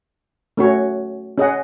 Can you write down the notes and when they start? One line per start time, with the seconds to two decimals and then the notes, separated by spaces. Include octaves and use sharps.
0.57 A3 C#4 F#4 C#5
1.38 C#4 G#4 D#5 F#5